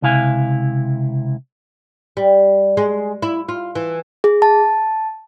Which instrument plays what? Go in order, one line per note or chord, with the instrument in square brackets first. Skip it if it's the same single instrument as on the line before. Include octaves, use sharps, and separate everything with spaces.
[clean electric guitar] C#2 C3 E4 F5 G#5
[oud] G3
G#3
E4
F4
E3
[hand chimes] G#4
A5